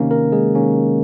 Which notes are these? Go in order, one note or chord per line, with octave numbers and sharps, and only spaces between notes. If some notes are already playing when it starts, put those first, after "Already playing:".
Already playing: C3 D#3 A#3 C#4
A#3 A#4
G#3 G#4
C3 D#3 A#3 C#4